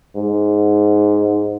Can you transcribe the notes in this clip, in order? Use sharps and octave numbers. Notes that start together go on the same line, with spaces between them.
G#2